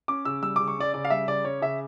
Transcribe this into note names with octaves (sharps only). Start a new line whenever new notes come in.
C#4 D6
C#3 E6
G3 E6
C#3 D6
C#6
C#4 D5
C#3 D5
F5
G3 E5
C#3 D5
C#4 C#5
C#3 E5